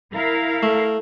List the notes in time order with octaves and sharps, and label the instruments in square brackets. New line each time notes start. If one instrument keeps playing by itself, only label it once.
[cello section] E4 A#4 F5
[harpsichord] A3